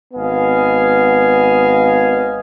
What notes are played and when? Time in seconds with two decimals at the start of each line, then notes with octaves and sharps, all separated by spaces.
0.14 G#1 B3 D#5 F5 G#5